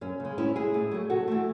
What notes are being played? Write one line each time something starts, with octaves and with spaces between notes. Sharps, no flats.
F#2 C#4
C#3 G#3
A2 C#4 E4
G#3 E4 G#4
A2
F#3 A3
C3 F#4 A4
E3 A3